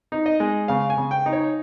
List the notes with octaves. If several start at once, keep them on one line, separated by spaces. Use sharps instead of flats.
D#4
D#5
G#3
C#3 F5
G#5
C#3
G5
D#4
C#5